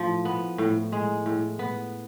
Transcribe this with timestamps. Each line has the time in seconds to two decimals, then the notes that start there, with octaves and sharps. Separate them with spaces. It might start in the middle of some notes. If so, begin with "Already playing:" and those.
Already playing: A2 F3
0.25 B3
0.58 A2
0.92 G#3
1.26 A2
1.59 B3